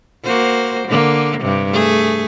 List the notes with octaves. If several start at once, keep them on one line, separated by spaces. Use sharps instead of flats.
A#3 F#4 C5
D3 A#3
G2 C3
A3 G#4